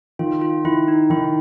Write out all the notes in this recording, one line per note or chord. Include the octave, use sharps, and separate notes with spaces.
D#3 F4
F4
D#3 E4
D#4
D#3 E4
E4